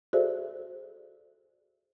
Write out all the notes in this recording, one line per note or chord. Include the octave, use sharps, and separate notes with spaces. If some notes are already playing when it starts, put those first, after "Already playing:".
F#4 G#4 A4 C5 D5 E5